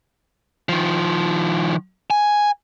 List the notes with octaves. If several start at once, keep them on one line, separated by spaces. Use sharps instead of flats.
D#3 F3
G#5